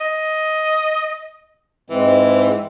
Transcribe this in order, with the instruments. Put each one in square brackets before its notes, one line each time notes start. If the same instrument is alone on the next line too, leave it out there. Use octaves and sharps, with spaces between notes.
[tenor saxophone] D#5
[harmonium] G#2 G#3 C4 [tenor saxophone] E3